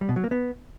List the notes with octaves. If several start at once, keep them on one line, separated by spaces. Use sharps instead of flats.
G3
B2
F#3
A#3
B3